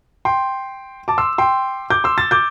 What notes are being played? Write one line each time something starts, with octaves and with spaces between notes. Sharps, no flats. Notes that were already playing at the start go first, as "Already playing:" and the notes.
G5 C6
A5 D6
C6 E6
G5 C6
D6 G6
C6 E6
E6 A6
D6 G6